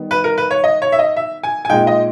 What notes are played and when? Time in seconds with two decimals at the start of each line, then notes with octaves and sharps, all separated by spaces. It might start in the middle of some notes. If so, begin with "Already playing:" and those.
Already playing: D#3 G3 B3
0.11 B4
0.24 A#4
0.38 B4
0.51 C#5
0.64 D#5
0.82 C#5
0.92 E5
0.99 D#5
1.16 E5
1.43 G#5
1.65 G#5
1.70 A#2 G#3 D#4 G5
1.87 D#5